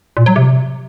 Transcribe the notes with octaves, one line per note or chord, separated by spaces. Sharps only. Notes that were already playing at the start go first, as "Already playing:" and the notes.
A#2
F#3
C3